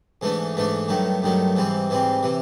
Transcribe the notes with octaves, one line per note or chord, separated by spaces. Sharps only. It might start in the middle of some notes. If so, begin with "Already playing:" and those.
G#2 E3 A3 D4
G#2 E3 A3 D4
G2 D#3 F#3 A3
G2 D#3 F#3 A3
G#2 E3 G3 C4
G#2 E3 G3 C4
C3 E3